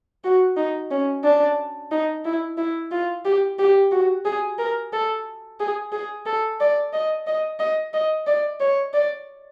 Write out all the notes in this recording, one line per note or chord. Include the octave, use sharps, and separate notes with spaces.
F#4
D#4
C#4
D4
D#4
E4
E4
F4
G4
G4
F#4
G#4
A#4
A4
G#4
G#4
A4
D5
D#5
D#5
D#5
D#5
D5
C#5
D5